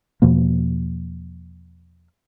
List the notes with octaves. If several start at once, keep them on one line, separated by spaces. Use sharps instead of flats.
E2 B2 F3 A#3